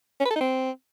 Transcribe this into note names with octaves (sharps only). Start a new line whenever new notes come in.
C#4
B4
A4
D#4
C4